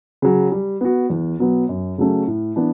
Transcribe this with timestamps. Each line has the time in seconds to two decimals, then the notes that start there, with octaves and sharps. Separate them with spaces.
0.22 C#3 F#3
0.52 G3
0.81 B3 F#4
1.10 E2
1.39 B2 F#3 B3
1.69 F#2
1.98 C#3 F#3 A3 C#4
2.27 A2
2.56 E3 B3 D4